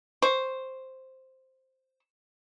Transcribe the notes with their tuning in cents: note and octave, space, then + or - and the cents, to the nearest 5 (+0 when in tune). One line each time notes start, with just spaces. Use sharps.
C5 +0 C#6 +0